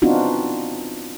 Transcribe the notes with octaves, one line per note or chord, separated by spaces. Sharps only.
B3 C4 D4 D#4 F4 F#4